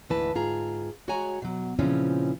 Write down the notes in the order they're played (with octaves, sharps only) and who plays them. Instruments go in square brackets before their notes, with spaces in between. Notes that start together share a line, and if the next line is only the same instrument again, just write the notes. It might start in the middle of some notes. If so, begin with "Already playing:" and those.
[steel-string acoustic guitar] D2 G#2 E3 B4 A5
G#2 F4 G#4 A#5
G#3 F#4 C#5 F#5 G#5 A#5
B2 F#3
A#2 C#3 E3 F3 C4 C#4